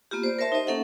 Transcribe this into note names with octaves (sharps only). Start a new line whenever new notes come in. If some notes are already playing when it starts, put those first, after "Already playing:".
A#3 B3 F4 G4
C5 D5
A#4 C5 C#5 E5 A5 C6
D#4 G4 C5 D#5
A#3 C#4 A4 E5 F#5